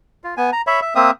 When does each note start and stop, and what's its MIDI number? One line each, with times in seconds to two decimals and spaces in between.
0.24 0.34 65
0.37 0.50 59
0.37 0.50 80
0.53 0.62 82
0.67 0.80 73
0.67 0.80 76
0.67 0.80 83
0.82 0.94 76
0.95 1.11 58
0.95 1.11 60
0.95 1.11 76
0.95 1.11 87